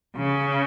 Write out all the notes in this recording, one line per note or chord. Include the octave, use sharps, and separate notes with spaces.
C#3